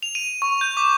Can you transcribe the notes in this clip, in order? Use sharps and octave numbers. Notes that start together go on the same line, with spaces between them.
F7
D#7
C#6
G6
D6